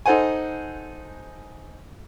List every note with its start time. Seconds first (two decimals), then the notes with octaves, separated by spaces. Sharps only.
0.06 D#4 A4 C5 F#5 G#5